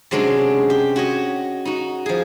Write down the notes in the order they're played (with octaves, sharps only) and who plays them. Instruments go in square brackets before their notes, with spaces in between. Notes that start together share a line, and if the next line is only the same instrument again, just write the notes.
[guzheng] C3 F#3 G#3 C#4 D4
G4
F#4 C#5 D#5
D#4 F#4
F3 G#4